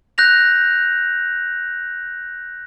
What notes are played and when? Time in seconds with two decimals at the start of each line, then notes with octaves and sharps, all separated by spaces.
0.18 F#6 G6 A#6 F7